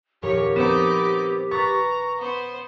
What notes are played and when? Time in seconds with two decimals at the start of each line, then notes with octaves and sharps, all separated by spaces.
0.22 D#1 F2 G4 A#4 C#5
0.56 B3 C4 D#4 D6 E7
1.51 B4 A#5 C#6 A6
2.18 B3 C5